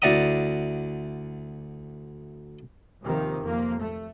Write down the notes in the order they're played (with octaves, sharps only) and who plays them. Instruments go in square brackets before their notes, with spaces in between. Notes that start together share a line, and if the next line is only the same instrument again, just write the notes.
[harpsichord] D2 E4 D5 F#5 A#5 D#6
[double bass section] D#2 C3 D#3 F3
F2 A#3
A3